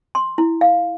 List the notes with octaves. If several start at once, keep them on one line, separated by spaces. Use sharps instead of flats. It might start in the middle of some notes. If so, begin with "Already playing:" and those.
C6
E4
F5